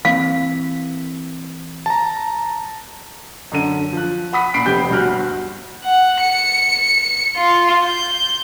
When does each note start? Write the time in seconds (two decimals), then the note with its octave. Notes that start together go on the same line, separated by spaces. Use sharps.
0.05 E3 A#3 C4 F5
1.86 A5 A#5
3.52 F#2 D3 D#7
3.93 F3 F#6
4.33 F#5 B5 D#6 B6
4.54 A#2 B5 C7 D7
4.66 F1 B3 G4 G6
4.90 G1 D2 F#4 F6 F#6
5.84 F#5
6.20 C#7
7.36 F4
7.84 G6